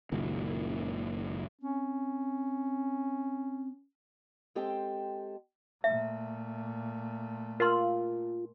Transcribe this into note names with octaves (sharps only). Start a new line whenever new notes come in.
F#1 C#2 A#2 D#3
C4 C#4
G#3 C4 G4 A4 G5
A#2 A3 E5
F4 A#4 C6